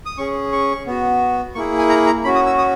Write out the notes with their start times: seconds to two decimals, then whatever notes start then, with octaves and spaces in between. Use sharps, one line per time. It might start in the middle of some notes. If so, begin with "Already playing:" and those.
0.06 D#6
0.18 C#4 G#4 C#6
0.52 C#6
0.87 B3 F#4
1.55 A#3 E4 G#4 C#6
1.79 G#5
1.89 A#5
2.06 A#5
2.24 C#4 F#4 B5
2.35 D#6
2.46 E6
2.58 D#6